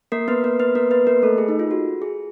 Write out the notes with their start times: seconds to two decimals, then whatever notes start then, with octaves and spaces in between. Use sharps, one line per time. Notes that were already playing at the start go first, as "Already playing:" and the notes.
0.12 A#3 A#4
0.28 B3 B4
0.44 A#3 A#4
0.60 B3 B4
0.75 A#3 A#4
0.91 B3 B4
1.07 A#3 A#4
1.22 A3 A4
1.38 G#4
1.49 D#4
1.59 F4
1.71 F#4
2.02 G#4